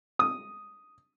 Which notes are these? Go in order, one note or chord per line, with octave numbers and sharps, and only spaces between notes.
D#6